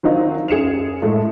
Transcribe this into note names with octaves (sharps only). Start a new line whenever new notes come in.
D#3 F#3 C4 D#4 F4 C5
F#2 G#4 C#7 E7 F7
A2 G#3 A3